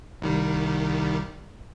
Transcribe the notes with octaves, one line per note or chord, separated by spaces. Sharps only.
C2 D#3 G3